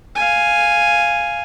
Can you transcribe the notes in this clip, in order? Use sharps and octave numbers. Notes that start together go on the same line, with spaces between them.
F5 G#5